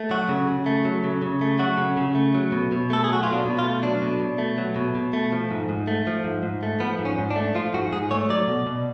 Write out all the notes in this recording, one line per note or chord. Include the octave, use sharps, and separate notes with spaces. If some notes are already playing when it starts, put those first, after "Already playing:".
Already playing: A3
F#3 F#4
C#3
C#3
A3
F#3
C#3
C#3
A3
F#3 F#4
C#3
C#3
A3
F#3
B2
B2
A3 A4
G#4
F#3 F#4
B2 F4
D4
B2
F4
A3
F#3 D4
B2
B2
A3
F#3
B2
B2
A3
F3
G#2
G#2
A3
F3
G#2
G#2
A3
F3 B3
G#2
C#4
G#2
D4
A3
F3 F4
G#2 F#4
G#2 G#4
A3 C#5
F#3 D5
B2
B2